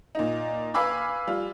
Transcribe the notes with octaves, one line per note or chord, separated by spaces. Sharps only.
A#2 D#4
B4 F5 G#5 B5 D6 E6
G3 F4